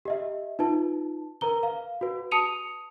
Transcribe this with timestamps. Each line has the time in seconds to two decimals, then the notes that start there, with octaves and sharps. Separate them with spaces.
0.05 G4 D#5 E5
0.59 D#4 F4 B4 A5
1.41 A#4 B4 A#5 G7
1.63 F5
2.01 F#4 B4
2.31 A5 D#6 C#7 D#7 F7